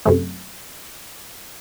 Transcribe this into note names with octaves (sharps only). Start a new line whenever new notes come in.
F#2 C3 A3